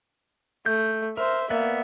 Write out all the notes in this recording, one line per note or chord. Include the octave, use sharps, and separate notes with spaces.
A3 G6
A#4 C5 E5
A#3 B3 B4 D5 E5